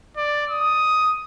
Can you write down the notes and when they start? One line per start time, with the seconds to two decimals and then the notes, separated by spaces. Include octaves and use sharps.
0.16 D5
0.50 D#6